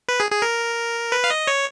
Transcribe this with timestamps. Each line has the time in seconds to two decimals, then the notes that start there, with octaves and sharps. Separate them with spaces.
0.08 B4
0.20 G#4
0.31 G#4
0.42 A#4
1.12 B4
1.24 F5
1.31 D#5
1.47 C#5